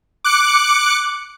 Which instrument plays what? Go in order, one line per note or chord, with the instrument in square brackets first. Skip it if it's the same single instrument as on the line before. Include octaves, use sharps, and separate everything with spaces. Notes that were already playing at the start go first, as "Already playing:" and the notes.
[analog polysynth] D6 F#6 C#7